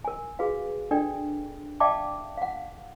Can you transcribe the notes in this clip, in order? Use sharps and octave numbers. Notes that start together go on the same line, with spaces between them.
A#4 G#5
F#4 G#4 B4 F5
D4 A4 D5 G5
D5 E5 F5 G5 A5 D6
F5 F#5